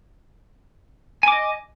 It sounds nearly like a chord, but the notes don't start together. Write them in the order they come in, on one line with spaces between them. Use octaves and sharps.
G#5 D6 D#5